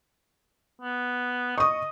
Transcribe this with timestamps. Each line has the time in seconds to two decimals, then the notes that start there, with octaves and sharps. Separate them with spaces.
0.81 B3
1.58 D#5 C#6 D#6